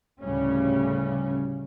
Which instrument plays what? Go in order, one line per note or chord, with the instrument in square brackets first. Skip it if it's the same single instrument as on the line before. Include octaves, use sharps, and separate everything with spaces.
[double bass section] D2 A2 C#3 G3 C#4